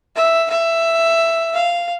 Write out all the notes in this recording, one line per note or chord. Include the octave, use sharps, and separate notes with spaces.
E5
E5
F5